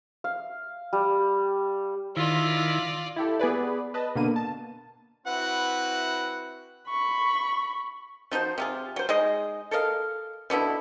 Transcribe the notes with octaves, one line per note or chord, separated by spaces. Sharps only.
F5
G3
D#3 E4 F4 D5
E4 G4 A4
B3 G#4 B4 D5
B4 D#5 A5
B2 D3 A#3 D#7
A5
C4 E4 F#4 B4 F#5
B5 C#6
F3 D#4 F#4 C5
C3 F4 G#4
F#3 C5
G#3 D#4 G#4 D#5
A4 A#4 D#5 F5
B2 D3 B3 E4